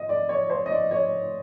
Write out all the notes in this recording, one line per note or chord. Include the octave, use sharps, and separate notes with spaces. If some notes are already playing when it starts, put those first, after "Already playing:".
Already playing: D#5
D5
C#5
C5
D#5
D5
C#5